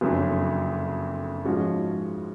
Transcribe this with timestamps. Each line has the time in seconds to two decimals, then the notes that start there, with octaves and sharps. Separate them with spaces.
0.01 F#1 F2 D3 F#3
1.45 G#2 F3 G#3 C#4 F#4